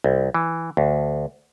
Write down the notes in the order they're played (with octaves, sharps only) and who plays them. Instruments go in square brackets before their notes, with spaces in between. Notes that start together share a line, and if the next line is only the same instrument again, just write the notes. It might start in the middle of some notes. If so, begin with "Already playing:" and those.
[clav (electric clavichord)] C2
E3
D2